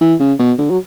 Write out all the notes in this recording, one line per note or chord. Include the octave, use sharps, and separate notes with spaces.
E3
C#3
B2
D3
F#3